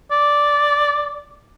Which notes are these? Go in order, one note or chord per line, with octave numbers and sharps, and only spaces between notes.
D5